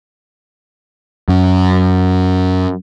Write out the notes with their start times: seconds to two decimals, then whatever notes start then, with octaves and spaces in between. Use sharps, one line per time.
1.28 F#2